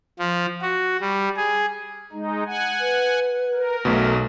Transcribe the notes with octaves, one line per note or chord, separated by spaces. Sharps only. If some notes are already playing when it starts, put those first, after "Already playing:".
F3
F#4
G3
G#4
G#3 D#4
F#5 G#5
B4
A#4
B1 B2 A3